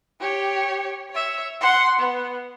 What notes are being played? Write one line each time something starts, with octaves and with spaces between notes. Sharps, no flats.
G4 C#5
C#5 E5
F#5 C6
B3